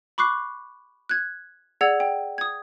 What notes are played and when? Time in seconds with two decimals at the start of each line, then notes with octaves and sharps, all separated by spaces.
0.18 B5 C#6 D6 F#6 C7
1.09 F#6 G#6
1.81 G#4 D5 F#5 E6 G#6 F7
2.00 G5
2.38 D#6 G#6